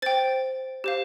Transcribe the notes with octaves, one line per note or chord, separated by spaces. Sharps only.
C5 G5 A6
G4 C5 F5